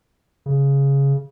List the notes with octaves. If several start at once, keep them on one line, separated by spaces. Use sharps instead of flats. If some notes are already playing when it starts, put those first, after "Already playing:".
C#3